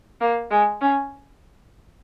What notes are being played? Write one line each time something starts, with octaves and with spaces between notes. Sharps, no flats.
A#3
G#3
C#4